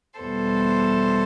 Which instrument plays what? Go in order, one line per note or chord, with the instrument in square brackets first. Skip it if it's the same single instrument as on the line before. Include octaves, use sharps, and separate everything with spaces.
[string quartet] E2 B2 G3 B3 A4 C5